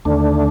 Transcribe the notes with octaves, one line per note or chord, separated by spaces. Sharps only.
D#2 D3 A3 D4